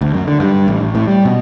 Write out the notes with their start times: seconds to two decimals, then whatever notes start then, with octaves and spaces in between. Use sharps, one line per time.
0.01 D2
0.14 F#2
0.27 D3
0.40 G2
0.68 A1
0.81 A1
0.95 A2
1.07 G3
1.25 B2